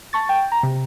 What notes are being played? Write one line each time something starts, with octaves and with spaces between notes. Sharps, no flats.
A5 C#6 A6
G5
A#5
C3